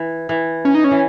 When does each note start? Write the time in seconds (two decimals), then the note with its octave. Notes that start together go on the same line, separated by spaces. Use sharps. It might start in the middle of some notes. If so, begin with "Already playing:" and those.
Already playing: E3
0.29 E3
0.65 C#4
0.75 D#4
0.84 C#4
0.91 E3